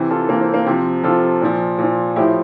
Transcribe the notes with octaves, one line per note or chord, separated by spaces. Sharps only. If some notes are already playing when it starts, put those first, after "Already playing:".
Already playing: C3 E3
F4 A4
C3 E3 A#3
C4
A#3
C3 F3 C4
C3 F3 F4 A4
A#2 F3
A#2 F3
A2 F3 E4 G4